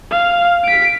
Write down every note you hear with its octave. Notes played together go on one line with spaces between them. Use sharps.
F5
B6 D7